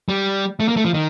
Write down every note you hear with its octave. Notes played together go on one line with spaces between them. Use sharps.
G3
A3
A#3
A3
F3
D#3